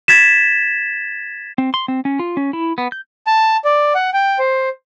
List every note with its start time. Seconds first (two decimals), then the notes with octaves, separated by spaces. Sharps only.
0.08 G#6 A6 B6 E7
1.58 C4
1.74 C6
1.88 C4
2.05 C#4
2.19 F4
2.37 C#4
2.53 E4
2.78 B3
2.92 G6
3.27 A5
3.65 D5
3.95 F#5
4.14 G5
4.39 C5